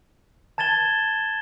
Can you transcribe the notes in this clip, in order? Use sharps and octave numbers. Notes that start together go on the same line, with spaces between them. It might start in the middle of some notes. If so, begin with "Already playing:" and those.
A5 G#6 A6 E7 G7